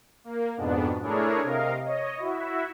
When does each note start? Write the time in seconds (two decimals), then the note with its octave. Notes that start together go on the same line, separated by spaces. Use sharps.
0.24 A#3
0.57 F2 G#2 B2 B3 D4
1.02 A3 D4 E4 G#4 A#4 C#5
1.43 C3 A#4 D#5 F5
1.85 C#5 D#5
2.17 E4 F#4 E5